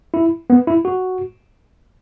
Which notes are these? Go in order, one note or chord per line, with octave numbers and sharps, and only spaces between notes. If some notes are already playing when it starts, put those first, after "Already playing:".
E4
B3
E4
F#4